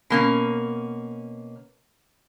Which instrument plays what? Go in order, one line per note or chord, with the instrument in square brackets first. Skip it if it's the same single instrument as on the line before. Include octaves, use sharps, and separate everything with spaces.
[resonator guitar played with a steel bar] B2 A#3 C#4